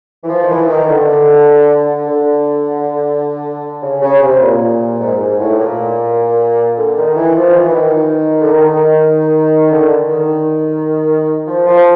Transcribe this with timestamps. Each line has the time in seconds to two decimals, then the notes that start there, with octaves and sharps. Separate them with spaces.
0.24 E3
0.29 F3
0.43 D#3
0.49 E3
0.68 D#3
0.88 D3
2.06 D3
3.83 C#3
4.02 C#3
4.22 C3
4.41 A#2
5.00 G#2
5.20 G#2
5.40 A2
5.59 A#2
6.77 D3
6.96 D#3
7.16 E3
7.36 F3
7.50 D#3
7.55 E3
7.69 E3
7.74 D#3
8.41 D3
8.53 D#3
9.72 D3
10.10 D#3
11.48 F3
11.67 F3